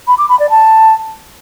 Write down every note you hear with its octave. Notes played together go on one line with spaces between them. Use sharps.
B5
D6
B5
D5
A5